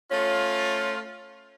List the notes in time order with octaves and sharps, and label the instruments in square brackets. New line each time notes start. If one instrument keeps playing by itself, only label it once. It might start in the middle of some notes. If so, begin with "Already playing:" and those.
[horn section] A3 C#4 F4